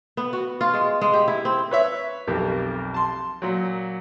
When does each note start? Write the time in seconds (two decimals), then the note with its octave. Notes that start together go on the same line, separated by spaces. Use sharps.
0.17 B3
0.33 F#4
0.61 F4
0.74 G#3
1.01 G#3
1.14 G4
1.28 E4
1.45 C4
1.71 B4 C#5 E5
2.28 B1 F2 G4 A#4
2.94 A5 C6
3.42 A#2 F#3